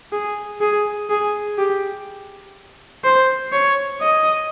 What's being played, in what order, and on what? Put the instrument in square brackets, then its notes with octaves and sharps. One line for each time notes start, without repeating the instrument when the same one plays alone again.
[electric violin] G#4
G#4
G#4
G4
C5
C#5
D#5